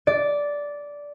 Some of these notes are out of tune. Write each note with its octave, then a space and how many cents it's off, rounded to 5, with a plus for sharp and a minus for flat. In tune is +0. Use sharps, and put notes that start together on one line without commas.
D5 -10